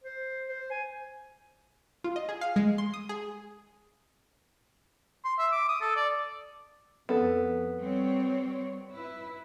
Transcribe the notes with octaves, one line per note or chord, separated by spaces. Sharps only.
C5
C5
G#5
F4
D#5
G#4
F5
G#3
C6
D#6
G#4
C6
E5
D6
D#6
A4
D5
F2 B3 A4
G3 C4 C#5
E4 B4